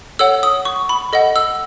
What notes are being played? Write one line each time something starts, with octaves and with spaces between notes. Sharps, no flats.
A4 C#5 F#5 E6
D#6
C#6
B5
A4 D#5 F#5
E6